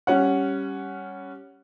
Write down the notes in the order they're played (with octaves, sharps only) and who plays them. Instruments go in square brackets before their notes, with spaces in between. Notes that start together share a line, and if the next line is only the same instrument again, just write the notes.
[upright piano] G3 C#4 F#5